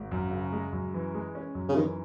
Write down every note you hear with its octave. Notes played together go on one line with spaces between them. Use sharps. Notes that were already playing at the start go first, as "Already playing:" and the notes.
Already playing: G#1
F#2
C#3
G#3
F#2
E3
G#3
C#4
F#2
C#3
D#3 E3